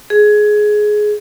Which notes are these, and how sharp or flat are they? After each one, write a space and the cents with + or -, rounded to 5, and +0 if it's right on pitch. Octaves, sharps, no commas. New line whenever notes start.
G#4 +15